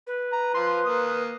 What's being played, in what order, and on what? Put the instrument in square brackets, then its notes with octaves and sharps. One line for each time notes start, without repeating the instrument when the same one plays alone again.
[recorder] B4
[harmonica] A#5
F3 C6
A#3 D#6